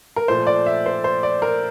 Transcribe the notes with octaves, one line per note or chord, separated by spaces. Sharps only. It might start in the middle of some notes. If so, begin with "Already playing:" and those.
A#4
A#2 F3 A3 C5
D5
E5
C5
C5
D5
A#4